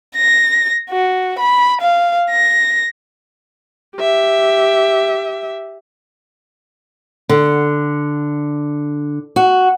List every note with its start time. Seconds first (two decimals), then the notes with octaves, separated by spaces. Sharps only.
0.16 A#6
0.90 F#4
1.39 B5
1.81 F5
2.30 A#6
3.97 G4 E5
7.29 D3
9.36 F#4